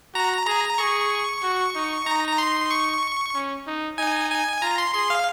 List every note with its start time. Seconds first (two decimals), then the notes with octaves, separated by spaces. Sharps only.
0.14 F#4 A#5
0.47 G#4 A#5
0.78 G#4 C#6
1.43 F#4
1.75 D#4
2.06 D#4 A#5
2.28 A#5
2.38 C6
2.71 C#6
3.34 C#4
3.67 D#4
3.98 D#4 G#5
4.30 G#5
4.62 F4 A#5
4.78 C6
4.94 G#4 C6
5.10 F5